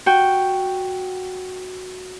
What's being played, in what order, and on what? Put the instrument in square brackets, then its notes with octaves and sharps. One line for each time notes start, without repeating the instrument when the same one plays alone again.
[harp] F#4 G5